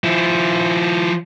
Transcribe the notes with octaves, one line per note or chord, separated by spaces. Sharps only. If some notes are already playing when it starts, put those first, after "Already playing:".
F3 E4